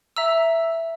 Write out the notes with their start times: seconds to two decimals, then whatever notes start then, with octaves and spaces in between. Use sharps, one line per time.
0.17 E5 A#5 E6